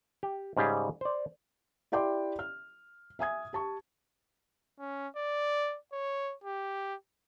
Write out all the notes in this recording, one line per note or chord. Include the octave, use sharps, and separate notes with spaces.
G4
G#2 C#3 G3 G4 G#4
C5 D5
E4 G4 D5 G5 C6 D6
F6
E5 G#5 D#6 G#6
G4 A5 C#6
C#4
D5
C#5
G4